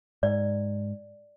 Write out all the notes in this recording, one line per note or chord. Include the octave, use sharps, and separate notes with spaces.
G#2 D5